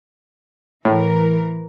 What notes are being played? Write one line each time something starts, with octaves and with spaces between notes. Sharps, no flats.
A2 E3 A#4